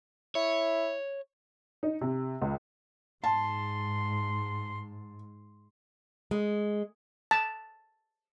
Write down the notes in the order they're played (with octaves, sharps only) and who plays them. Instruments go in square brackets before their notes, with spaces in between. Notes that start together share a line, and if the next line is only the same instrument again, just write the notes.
[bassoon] E4 [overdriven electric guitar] C#5
[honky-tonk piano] D#4
C3
C#2
[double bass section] G#2 [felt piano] A5 [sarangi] C6
[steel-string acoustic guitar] G#3
[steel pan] A5